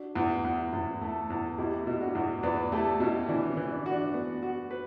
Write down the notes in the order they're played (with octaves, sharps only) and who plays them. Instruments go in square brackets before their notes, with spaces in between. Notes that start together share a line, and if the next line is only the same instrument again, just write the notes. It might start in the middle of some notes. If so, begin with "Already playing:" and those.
Already playing: [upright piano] D4 F#4
[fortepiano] E2
E2
[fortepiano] E2 [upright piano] C#4 E4
[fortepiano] A3
E2
[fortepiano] B2 [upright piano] E4 G4
[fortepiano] B2
[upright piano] D4 F#4
[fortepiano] E2
[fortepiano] E2 [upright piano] B4 D5
[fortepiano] A3 [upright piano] E4 G4
[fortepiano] B2 [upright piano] C#4 E4
[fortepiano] E3 [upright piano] D4
[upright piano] C#4
[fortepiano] E3
[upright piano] D4
[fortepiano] F#4
[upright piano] D4
[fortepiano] B3
F#4
B4